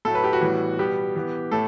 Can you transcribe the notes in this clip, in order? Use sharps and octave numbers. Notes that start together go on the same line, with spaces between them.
A2 F#3 A3 A4
B4
G4
F#4
A2 E3 G3 B3
B2 G3 B3 G4
E3 B3
A2 A3 A4